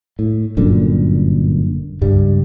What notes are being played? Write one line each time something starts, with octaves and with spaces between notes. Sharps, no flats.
A2
G1 F#2 A#2 D3
C#2 G2 G3